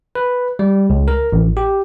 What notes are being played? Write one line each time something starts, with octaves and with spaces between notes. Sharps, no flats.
B4
G3
C#2
A#4
A1
G4